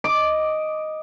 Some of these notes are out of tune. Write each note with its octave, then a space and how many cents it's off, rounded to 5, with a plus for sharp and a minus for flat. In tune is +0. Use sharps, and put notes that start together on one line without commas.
D#5 +0 D6 +0